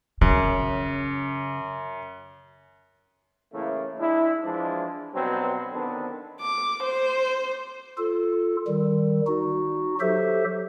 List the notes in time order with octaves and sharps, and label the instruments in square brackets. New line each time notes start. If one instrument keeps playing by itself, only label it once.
[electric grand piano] F#2 [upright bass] C#3
[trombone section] A2 C#3 E3 A3 A#3
G#3 D4 E4
E3 F3 G#3 D4
G2 B2 F#3 C4
D3 D#3 B3 C4 D4
[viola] D6
C5
[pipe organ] F4 A4
D#3 G3
D#4 F#4
F#3 G4 A4 C5 E5